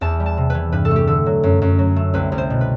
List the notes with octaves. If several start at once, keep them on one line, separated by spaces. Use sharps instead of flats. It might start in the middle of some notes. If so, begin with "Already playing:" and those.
E2 A5
G3
A5
C3
E3 B4
G2 B4
A4
A3 G4
D3 A4
F#3
F#2
F#2
F#3
A3
C2 B4
C2
C5
B2
B4